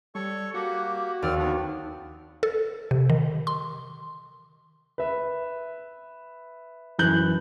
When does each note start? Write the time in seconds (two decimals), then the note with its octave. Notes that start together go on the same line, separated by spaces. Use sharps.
0.15 G3 A4 C#5 C#6
0.54 A#3 F#4 G4
1.22 D#2 C4 D5 F6
1.39 B3 D4
2.43 A4
2.91 C3
3.10 D#3
3.47 C6
4.98 B4 E5
6.99 F#2 E3 F#6 G6 F#7